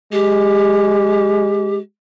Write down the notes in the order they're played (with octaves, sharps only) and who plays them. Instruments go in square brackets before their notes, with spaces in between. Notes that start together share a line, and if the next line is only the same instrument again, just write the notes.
[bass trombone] G#3 [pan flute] G4